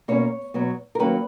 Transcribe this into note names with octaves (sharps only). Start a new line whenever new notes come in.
B2 A#3 C#4 C#5
B2 F#3 B3
A#4
D#3 F#3 A#3 C#4 B4